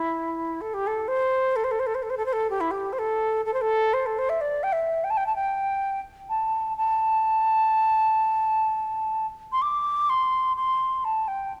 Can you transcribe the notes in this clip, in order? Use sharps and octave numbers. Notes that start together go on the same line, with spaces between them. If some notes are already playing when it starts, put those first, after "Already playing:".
Already playing: E4
A4
G4
A4
C5
A4
C5
A4
C5
A4
C5
A4
C5
A4
C5
A4
G4
E4
G4
C5
A4
A4
C5
A4
C5
A4
C5
E5
D5
G5
E5
G5
A5
G5
A5
G5
A5
A5
C6
D6
C6
C6
A5
G5